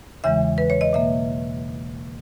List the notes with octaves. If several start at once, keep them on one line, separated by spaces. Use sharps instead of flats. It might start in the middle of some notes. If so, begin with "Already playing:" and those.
E2 C#3 E3 G#3 E5
B4
C#5
D#5
B2 A#3 E5